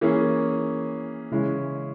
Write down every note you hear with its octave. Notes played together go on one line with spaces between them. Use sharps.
E3 A#3 C#4 G#4
C#3 E3 G#3 C#4 E4